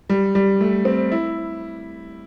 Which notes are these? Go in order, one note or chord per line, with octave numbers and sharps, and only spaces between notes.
G3
G3
A3
C4
E4